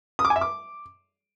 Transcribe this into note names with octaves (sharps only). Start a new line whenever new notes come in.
D#6
D6
G#5
E5
D6